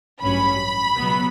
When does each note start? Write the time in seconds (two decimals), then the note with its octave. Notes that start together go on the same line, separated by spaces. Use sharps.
0.22 A1 G2 F#3 C#4 B5
0.96 C#2 B2 F#3 B3